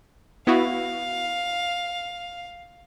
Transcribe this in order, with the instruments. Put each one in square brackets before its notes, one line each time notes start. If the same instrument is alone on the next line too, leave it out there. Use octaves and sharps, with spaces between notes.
[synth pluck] B3 E4 F#4 [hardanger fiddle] F5